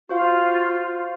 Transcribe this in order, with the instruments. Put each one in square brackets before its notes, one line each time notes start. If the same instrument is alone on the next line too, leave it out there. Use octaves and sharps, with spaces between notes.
[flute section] F4 [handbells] F#4 C5 F5